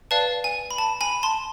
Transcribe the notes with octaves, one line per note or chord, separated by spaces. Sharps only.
B4 D5 F5 A5
G#5
B5
A5
G#5 B5
A5 C6